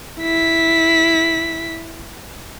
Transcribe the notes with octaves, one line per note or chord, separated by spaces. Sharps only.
E4 B6